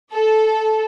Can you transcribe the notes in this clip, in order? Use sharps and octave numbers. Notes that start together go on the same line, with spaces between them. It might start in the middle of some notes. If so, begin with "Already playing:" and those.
A4